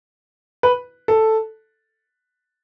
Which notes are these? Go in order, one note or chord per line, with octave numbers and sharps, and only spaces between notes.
B4
A4